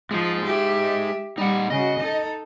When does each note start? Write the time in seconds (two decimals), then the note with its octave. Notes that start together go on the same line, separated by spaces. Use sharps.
0.11 F3 G#3 D#4
0.45 G4 E5
1.38 G3 D#4 F#5
1.70 C#3 F#4 D#5
1.99 D#4 A4